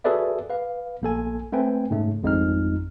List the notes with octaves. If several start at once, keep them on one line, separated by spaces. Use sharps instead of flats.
F#4 G#4 A4 B4 D5 E5
B4 F5
A#1 A#3 A4 G#5
A3 C4 B4 G5 G#5
G#2 C#3 A3
G#1 F2 G#3 D#4 F6